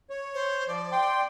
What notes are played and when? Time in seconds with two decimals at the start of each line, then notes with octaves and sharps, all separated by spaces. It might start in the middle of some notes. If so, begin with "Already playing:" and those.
0.10 C#5
0.34 C5
0.68 F3 D5
0.92 G5 C6